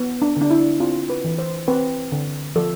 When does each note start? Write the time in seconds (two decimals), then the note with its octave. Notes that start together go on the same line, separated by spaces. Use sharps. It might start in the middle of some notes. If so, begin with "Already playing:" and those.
Already playing: B3
0.22 D4
0.37 D3 D4
0.51 E4
0.80 C4 F4
1.10 B4
1.24 E3
1.39 C5
1.68 C4 B4
2.12 D3
2.56 F3 A4